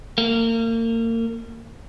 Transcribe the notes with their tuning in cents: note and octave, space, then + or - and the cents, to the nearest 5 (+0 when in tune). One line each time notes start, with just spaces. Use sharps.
A#3 -35